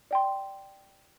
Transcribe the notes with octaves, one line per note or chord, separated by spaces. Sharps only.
D5 G5 C6